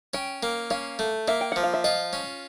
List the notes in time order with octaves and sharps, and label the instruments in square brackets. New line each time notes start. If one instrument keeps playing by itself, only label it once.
[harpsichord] C#4 [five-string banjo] G5
[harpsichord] A#3
[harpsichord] C#4 [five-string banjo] F5
[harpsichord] A3
[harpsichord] A#3 [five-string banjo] E5
[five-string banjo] G5
[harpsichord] F3 [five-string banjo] F#5
[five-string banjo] F5
E5
[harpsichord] F4 [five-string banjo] D#5
[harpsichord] C#4